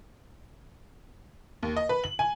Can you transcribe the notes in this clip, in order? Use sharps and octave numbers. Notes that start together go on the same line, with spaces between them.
D#2
D#5
B4
F#7
G#5